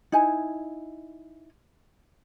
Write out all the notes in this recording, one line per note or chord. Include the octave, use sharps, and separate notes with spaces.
D#4 E4 G#5